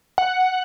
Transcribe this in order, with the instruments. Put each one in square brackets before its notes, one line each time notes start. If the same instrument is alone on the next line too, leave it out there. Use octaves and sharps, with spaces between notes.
[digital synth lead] F#5